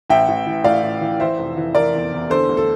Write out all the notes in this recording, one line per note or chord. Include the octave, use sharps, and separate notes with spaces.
A1 E5 G5
A1
E3
A2 D5 F5
A1
E3
E3 C5 E5
F1
E3
E3 A#4 D5
E2
E2
D3 A4 C5
D2
A4